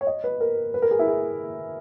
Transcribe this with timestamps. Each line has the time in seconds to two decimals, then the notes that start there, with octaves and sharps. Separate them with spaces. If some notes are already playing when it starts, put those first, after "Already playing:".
0.01 C#5
0.07 D#5
0.24 B4
0.40 A#4
0.74 B4
0.82 A#4
0.91 G#4
0.99 E4
1.07 G#4